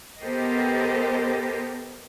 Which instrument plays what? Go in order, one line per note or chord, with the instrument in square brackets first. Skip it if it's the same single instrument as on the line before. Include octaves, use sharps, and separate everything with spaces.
[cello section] B3 G4 A4 A#4 C5 D#5